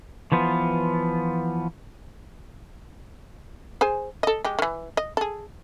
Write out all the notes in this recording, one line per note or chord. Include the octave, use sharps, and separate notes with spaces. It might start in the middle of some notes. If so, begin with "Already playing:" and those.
E3 F3 B3 F4
G#4 C5 G#5
A4 D#5
G#3 G4
D#3 E3
D#5
G#4 A4